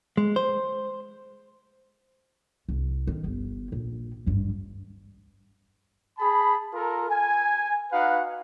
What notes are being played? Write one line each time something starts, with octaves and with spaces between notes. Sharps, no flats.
G#3
C5
C2
D#3
G1
A#1
G#1 G2
G#4 A5 B5
F4 A4 A#4
G#5
D#4 F#4 B4 F5 F#5